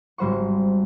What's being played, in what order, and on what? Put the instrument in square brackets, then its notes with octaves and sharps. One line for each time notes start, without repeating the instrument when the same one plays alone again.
[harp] G#1 G3 C5 F#5 C#6